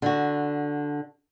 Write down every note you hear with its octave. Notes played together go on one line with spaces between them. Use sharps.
D3 F#4